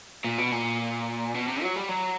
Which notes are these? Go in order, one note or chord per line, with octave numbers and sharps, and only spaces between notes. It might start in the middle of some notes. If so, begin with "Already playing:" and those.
A#2
B2
A#2
B2
C3
F#3
G3
F#3